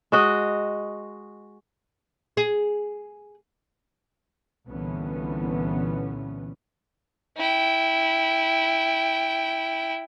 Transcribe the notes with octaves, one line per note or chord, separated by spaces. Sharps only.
G#3 F#4 D#5
G#4
C2 A#2 D3 E3 B3 C#4
E4 G5